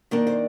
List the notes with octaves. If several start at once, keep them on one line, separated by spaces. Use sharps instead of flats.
D#3 A#3 D4
C5